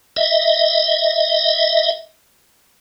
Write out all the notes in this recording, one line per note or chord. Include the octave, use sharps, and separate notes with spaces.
D#5 E5